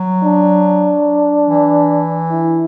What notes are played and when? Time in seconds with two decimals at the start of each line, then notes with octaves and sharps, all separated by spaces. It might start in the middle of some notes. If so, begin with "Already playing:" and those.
Already playing: F#3
0.24 D4
1.48 E3
2.31 E4